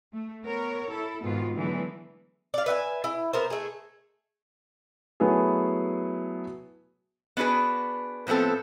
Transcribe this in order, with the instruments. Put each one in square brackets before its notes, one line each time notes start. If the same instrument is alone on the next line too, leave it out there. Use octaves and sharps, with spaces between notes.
[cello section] A3
B3 A#4 C#5
E4 A4
G#2 B2 D#3 B3 F4
D3 E3 F#3 G#3 A3 B3
[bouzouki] D5 F5
B4 E5 F#5 G#5
E4
B3 A#4 C5
A3 G#4
[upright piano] F#3 A3 B3 E4 G#4
[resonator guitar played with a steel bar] B3 D4 F#4 G#4 B4
A2 F3 B3 C4 A4